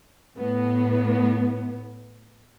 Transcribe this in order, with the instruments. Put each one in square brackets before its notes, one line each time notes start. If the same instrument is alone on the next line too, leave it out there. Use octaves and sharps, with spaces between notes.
[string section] A2 B3